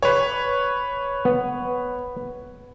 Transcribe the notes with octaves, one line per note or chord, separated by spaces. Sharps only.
B4 C#5
B3